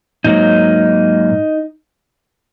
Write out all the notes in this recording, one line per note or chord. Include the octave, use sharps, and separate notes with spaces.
G#2 F#3 A#3 D#4